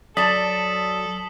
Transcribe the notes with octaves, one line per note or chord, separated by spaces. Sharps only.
F#3 A4 D5 A5 D#6 B6